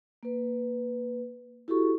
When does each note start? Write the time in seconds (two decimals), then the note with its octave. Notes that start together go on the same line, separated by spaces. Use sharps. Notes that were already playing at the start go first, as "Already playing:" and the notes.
0.23 A#3 B4
1.68 E4 F#4 G4 A4 C#6